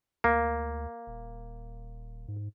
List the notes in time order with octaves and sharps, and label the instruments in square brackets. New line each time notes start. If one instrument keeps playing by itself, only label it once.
[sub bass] D2 [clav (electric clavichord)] A#3
[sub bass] D#1
G#2